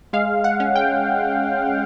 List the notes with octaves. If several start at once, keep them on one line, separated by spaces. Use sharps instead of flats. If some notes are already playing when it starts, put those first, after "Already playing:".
G#3 F5
F#5
C#4
G5